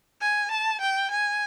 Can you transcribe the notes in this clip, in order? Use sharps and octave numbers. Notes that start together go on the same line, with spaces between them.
G#5
A5
G5
G#5